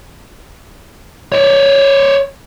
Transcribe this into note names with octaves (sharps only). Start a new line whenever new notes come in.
C#5 D5